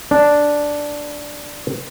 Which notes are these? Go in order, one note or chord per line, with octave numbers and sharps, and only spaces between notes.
D4